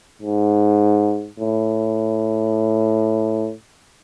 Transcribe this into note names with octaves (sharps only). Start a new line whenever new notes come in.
G#2
A2